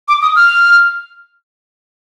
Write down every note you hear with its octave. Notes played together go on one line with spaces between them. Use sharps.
D6
D#6
F6